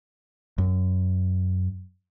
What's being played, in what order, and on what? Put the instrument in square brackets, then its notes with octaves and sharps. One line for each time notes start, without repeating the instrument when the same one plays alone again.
[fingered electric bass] F#2